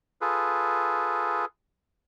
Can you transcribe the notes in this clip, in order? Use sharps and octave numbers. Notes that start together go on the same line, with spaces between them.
F4 G#4 A4 B4